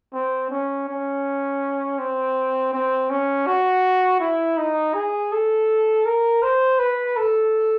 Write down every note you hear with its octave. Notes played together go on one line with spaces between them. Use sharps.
C4
C#4
C#4
C4
C4
C#4
F#4
E4
D#4
G#4
A4
A#4
C5
B4
A4